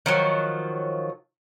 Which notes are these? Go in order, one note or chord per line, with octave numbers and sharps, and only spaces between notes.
D#3 F3 F#3